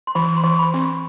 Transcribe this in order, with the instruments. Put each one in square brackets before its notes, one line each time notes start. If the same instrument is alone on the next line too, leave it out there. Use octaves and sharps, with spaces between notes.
[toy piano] C6
[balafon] E3 [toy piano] B5
[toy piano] C6
[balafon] E3
[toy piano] B5
[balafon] C4
[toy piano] C#6